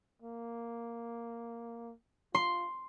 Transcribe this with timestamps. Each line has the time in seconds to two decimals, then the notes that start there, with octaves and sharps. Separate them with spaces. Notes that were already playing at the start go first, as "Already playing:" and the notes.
0.22 A#3
2.35 F4 C6